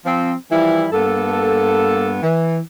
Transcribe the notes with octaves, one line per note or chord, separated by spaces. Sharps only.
F3 C4
E3 F3 G3 E4
G2 A#3 B3 A4
E3